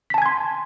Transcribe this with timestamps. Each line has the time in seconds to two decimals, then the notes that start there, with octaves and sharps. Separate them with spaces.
0.10 B6
0.14 A5
0.18 G#5
0.22 G#6
0.26 C6